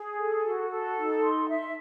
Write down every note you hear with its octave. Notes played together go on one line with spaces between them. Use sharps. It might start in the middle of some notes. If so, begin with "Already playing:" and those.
Already playing: G#4
A4
F#4
A4
D#4
C6
E5